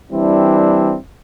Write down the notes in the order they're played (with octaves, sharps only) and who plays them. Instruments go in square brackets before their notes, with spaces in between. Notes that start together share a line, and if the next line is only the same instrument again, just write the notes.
[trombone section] E3 G3 C4 D4 E4